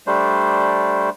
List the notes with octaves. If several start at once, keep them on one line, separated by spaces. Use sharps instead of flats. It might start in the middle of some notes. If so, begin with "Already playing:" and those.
G3 A3 D4 C5